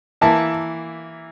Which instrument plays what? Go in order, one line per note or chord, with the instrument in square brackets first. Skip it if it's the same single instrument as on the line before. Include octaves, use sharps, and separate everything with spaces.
[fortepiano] E3 A#3 E4 [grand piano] A5